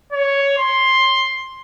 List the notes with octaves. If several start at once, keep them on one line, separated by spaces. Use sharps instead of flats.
C#5
C6